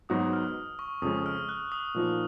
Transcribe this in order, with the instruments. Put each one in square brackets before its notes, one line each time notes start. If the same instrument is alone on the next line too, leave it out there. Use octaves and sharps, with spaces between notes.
[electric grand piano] G#2 F#3 B3 D#4 F#4 [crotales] D#6
[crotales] F6
C#6
[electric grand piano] F2 C#3 G#3 [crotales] D#6
[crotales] F6
F#6
D#6
[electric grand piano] A#2 F3 A#3 D#4 F#4